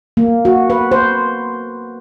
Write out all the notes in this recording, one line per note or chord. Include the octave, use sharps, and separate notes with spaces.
A#3
F#4
B4
C5